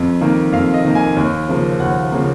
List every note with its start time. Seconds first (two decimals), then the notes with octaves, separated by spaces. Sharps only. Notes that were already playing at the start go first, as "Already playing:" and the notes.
Already playing: F2
0.21 D#3 A#3
0.52 F2 F5
0.74 D#5
0.84 D#3 A#3
0.95 G#5
1.17 D#2
1.49 C#3 F3 A#3
1.79 D#2 F#5
2.12 C#3 F3 A#3